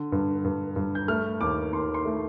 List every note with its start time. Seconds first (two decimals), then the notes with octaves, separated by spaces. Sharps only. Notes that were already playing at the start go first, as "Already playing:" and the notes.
Already playing: D3
0.12 G2
0.44 G2
0.76 G2
0.95 G6
1.08 A3 F6
1.41 D#2 D6
1.73 D#2 C6
1.94 C6
2.05 A3